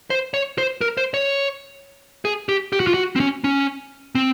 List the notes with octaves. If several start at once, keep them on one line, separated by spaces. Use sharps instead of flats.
C5
C#5
C5
A#4
C5
C#5
G#4
G4
G4
F#4
F4
F#4
C4
C#4
C#4
C4